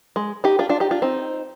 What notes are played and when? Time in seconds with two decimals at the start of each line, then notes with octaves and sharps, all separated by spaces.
0.16 G#3
0.44 D#4 G4
0.59 D4 F4
0.69 D4 F4
0.80 D#4 G4
0.91 D4 F4
1.02 C4 D#4